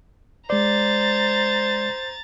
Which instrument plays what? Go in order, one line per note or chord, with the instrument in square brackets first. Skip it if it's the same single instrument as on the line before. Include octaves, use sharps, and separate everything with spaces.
[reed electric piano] G#3 D5 [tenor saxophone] C5 [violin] A#5 A6